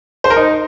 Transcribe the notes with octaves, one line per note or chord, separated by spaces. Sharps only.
C5
A#4
D#4